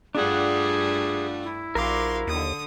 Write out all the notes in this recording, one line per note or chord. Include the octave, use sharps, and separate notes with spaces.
G2 G3 A3 D4 F4 G#4 F#5
E4
A#1 F#4 A#4 F5 C6 D6
D#2 D3 D#6